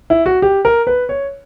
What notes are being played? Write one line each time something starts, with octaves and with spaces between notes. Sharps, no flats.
E4
F#4
G4
A#4
B4
C#5